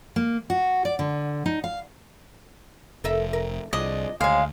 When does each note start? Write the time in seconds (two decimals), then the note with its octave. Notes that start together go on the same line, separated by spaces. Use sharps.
0.16 A#3
0.50 F#4
0.85 D5
0.99 D3
1.46 D#4
1.64 F5
3.04 F1 A4 A#4 E5
3.33 A#4
3.73 C2 F3 D4 G#4 D#5
4.21 D2 D#3 G#3 C#5 F5